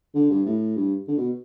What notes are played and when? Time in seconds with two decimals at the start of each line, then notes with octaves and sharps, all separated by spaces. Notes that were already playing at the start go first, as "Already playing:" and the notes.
0.15 D3
0.31 G2
0.46 A2
0.76 G2
1.08 D3
1.18 B2